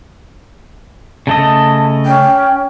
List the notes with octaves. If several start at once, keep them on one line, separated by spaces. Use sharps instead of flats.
C#3 A3 D#5 A5
C#4 G5